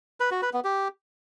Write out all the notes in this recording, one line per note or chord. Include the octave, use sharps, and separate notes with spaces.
B4
F#4
B4
B3
G4